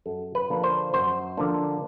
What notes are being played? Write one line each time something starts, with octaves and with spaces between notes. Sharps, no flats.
F#2 A4
B4
D3 F3 A#3 D4
C5
F#2 C5
D3 F3 A#3 D4